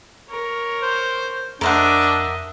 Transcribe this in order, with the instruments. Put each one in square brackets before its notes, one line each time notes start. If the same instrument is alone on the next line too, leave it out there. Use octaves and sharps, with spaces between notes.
[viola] A#4 C#5
[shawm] C5
[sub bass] F2 [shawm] D4 [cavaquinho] A#4 C5 F#5 [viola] D#5 E5